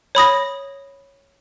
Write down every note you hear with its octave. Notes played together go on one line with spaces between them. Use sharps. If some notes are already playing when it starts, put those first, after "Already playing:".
C#5 B5 D#6 A#6